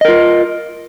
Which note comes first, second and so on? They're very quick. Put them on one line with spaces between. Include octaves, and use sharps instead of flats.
D#5 A#4 F4